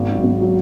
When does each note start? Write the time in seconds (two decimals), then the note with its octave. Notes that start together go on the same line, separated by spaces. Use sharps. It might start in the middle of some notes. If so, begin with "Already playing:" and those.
Already playing: G#1
0.09 G#2 F#3
0.24 G#1
0.41 F#3